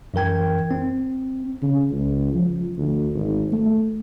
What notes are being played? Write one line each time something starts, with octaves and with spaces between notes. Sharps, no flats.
F#2 E3 A#4 G5 G#6
C4
C#3
C#2
F3
D2
G#1
A3